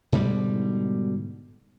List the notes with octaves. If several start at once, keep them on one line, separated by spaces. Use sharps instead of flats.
G#2 B2 D3 G3